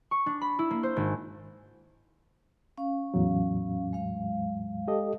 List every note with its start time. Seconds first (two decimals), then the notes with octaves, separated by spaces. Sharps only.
0.11 C#6
0.26 D4
0.41 B5
0.59 E4
0.71 A#3
0.83 C5
0.96 G#1
2.78 C#4 F5
3.14 E2 A2 F#3
3.93 G#3 F5
4.88 G4 A4 D#5